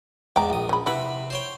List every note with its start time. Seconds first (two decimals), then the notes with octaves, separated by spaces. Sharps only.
0.36 E2 G#2 G5 A#5 D6
0.50 A#1 D#6
0.69 C#3 B5
0.86 C3 E3 E4 F#5 B5
1.30 C5 C#5 G5